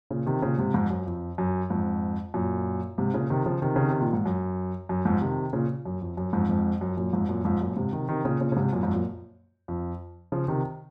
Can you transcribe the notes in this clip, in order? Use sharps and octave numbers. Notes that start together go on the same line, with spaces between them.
A#2 C#3
C3 D#3
A#2 C#3
G#2 C3
F2 G#2
F#2
F2
F#2
F2 G#2
F#2 A#2
G#2 C3
A#2 C#3
C3 D#3
C#3 F3
C3 D#3
C#3
C3
A#2
G#2
F#2
F#2
F2 G#2
C3 D#3
A#2 C#3
F#2
F2
F#2
F2 G#2
F2 G#2
F#2
F#2 A#2
F2 G#2
F#2 A#2
F2 G#2
F#2 A#2
G#2 C3
C3 D#3
C3 D#3
A#2 C#3
A#2 C#3
C#3
G#2 C3
F#2 A#2
F2 G#2
F#2 A#2
F2
C#3 F3
C3 D#3